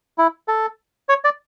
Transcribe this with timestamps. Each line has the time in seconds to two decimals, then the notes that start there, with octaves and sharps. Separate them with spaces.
0.18 E4
0.48 A4
1.09 C#5
1.24 D5